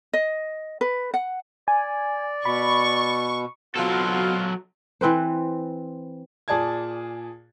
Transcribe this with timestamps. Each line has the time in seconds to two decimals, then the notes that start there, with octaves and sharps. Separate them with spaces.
0.13 D#5
0.81 B4
1.14 F#5
1.68 D5 G#5
2.45 B2 B5 C#6
3.76 B2 F#3 C4 F4 A4
5.01 E3 C4 B4 C5
6.48 A#2 G#4 D5 A5 G#6